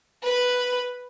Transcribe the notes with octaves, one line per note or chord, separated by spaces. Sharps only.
B4